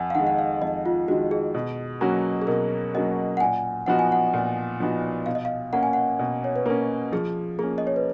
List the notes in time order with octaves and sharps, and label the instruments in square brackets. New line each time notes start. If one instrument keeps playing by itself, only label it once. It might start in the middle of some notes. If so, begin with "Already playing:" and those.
Already playing: [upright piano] F2 [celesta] F#5 G#5
[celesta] F5
[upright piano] D#3 G#3 [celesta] F#5
[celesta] F#5
F5
[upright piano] F2 [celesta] D#5
[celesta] F4
[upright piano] D#3 G#3 [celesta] F#4
[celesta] G#4
[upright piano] B2
F#3 A#3 C#4 F#4
[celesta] G#4
[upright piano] B2 [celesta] A#4
[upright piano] F#3 A#3 C#4 F#4 [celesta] D#5
[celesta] F#5
[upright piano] A#2 [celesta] G#5
[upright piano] F3 B3 D#4 F#4 [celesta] F#5
[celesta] G#5
F#5
[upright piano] A#2
F3 B3 D#4 F#4
[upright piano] B2 [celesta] F5
[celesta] D#5
F5
[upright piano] A#3 C#4 [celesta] F#5
[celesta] G#5
F#5
[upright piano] B2
[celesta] C#5
B4
[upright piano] A#3 C#4 [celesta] A#4
[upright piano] F3 [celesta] G#4
[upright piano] A#3 C#4 [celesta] G#4
[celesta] D#5
C#5
B4